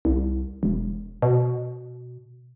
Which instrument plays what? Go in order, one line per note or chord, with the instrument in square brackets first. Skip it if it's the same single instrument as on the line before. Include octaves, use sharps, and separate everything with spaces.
[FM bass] C2
E1
B2